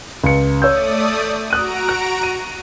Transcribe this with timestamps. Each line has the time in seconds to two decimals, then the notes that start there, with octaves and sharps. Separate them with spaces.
0.24 C#2 C#7
0.62 A3 C#5 D5 D#6 E6 G6
1.50 F#4 A#5 D#6 F#6 D7 D#7
1.89 F#6
2.23 D#7